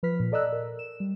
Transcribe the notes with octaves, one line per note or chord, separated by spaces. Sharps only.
F3 B4 F6 B6
A#2
A4 D5 D#5 A#5 E6 F#6
A#4
E7
G3